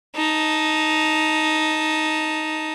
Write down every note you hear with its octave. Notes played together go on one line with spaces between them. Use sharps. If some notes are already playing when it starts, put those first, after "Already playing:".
D#4 A5